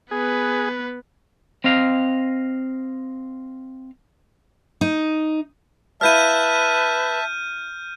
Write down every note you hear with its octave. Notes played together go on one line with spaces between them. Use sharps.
B3 G#4 B4
C4 D#5 F5
D#4
E4 B4 E5 F5 A5 F6 G6 D#7